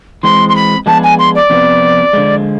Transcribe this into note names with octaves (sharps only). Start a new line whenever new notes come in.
E3 G#3 C4 C6
C6
B5
F3 G#3 B3 D4 G#4 A5
G#5
C6
D5
F2 C3 F3 B3
D3 F3 G#3